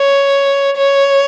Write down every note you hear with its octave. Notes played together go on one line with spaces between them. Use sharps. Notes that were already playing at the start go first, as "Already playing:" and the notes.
Already playing: C#5
C#5